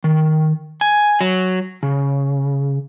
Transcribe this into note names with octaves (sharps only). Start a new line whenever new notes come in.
D#3
G#5
F#3
C#3